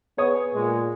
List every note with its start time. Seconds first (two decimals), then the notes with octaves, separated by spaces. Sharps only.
0.18 B3 G#4 C#5 D#6
0.55 A#2 G#3